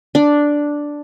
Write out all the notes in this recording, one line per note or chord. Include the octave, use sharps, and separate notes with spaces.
D4